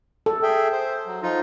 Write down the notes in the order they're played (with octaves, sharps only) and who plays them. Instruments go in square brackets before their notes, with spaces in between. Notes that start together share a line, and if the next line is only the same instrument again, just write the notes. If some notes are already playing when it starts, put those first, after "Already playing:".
[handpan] A4
[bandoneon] G#4 E5 G5
C5
F#3
F3 D#4 F4